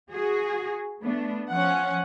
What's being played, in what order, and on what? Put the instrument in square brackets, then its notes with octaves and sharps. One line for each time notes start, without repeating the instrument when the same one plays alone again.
[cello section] F#4 G#4
A3 B3 D4
[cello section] F3 [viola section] C#4 F#5